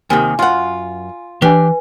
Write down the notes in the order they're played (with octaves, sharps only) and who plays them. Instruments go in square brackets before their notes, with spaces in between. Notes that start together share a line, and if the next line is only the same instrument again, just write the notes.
[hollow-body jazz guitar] D#2 C3 D#3 [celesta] G#5
[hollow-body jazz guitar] F#2 F#5 [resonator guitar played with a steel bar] F4
[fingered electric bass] E3 [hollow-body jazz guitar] D4 G4 [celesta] B4 G#5